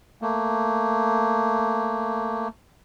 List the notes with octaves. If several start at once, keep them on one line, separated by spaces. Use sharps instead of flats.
A3 A#3